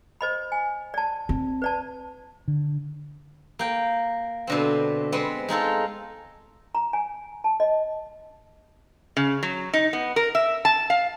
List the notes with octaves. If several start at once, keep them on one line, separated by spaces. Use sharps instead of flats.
C5 D#5 B5
G#5
D5 A5
C4
B4 D5 A5
D3
A#3 G5
B2 D3 C4
G#3 B3 C4
G#3 D#4 F4 A4
A#5
G#5
A5
D#5
C#3
F#3
D#4
B3
A#4
E5
A5
F5